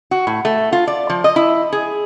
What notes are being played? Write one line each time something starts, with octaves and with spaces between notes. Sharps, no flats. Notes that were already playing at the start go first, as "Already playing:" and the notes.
F#4
A2
A3
F4
D5
F3
D#5
E4
G#4